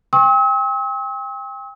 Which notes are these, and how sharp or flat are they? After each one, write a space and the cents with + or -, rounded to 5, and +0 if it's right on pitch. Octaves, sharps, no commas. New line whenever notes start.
G5 +30 C#6 -45 E6 -45